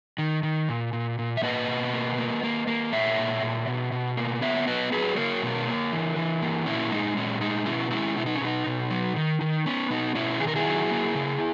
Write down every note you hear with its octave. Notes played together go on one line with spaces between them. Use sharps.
D#3
D#3
A#2
A#2
A#2
E5
A#3 B4 D#5
B2
A#3
A#3
A#3
A#3
A#2 C#5 E5
A#2
A#2
B2
B2
A#3
B3 C#5 E5
F#3 B4 D#5
F#3 G#4 B4
A#3 A#4 C#5
B2
A#3
E3
E3
A#3
A#2 C#4 E4
G#3 D#4
A#2 C#4
G#3 D#4
B2 C#4 E4
G#3 C#4 E4
B2 E4
D#4
C#4
B2 D#4
B2
F#3
D#3
D#3
B3 C#4
B2 D#4
B2 C#4 E4
D#3 G#4
A#4
E4 G#4
F#3
A#3
C#3